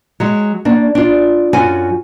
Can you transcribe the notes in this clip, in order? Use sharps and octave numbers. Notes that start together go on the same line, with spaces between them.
F#3 G#3
A#3 D4
D4 F4
F#2 F4 F#4 G#5